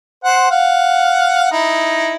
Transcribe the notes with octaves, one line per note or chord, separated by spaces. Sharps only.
C5 F#5
F5 F#5
D#4 E4